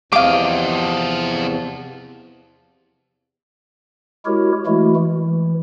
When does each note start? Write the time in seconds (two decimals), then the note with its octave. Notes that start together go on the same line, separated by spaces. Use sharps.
0.12 E2 C3 F3 D#5 F5 D6
4.26 G#3 E4 F#4 G4 A#4 C#5
4.66 E3 G#3 A3 E4 F#4
4.96 E3